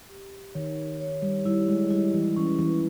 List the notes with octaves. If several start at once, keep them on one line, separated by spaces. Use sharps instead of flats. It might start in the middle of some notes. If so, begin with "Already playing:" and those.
G4
D#3 C#5
C#5
G3
G3 E4
G#3
G3 E4
E3
E3 C#4
E3